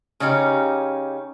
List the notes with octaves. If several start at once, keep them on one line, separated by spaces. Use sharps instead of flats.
C#3 C#4 D#4 G4